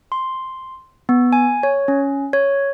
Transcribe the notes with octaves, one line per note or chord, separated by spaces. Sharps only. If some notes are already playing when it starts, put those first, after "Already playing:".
C6
B3
G#5
C#5
C#4
C#5